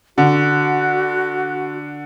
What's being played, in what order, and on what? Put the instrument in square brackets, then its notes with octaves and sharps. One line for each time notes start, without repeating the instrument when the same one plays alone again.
[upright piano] D3 [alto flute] F#4